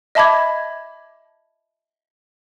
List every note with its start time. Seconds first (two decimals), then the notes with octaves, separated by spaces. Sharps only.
0.15 D#5 E5 A5 B5 D6 G#6